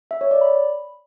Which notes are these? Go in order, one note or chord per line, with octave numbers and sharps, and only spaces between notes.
E5
C#5
D5
B5